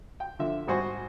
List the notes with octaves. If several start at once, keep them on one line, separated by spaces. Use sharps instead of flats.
G5
D3 F3 E5
G#1 G3 F#4 C5 G#5 C#6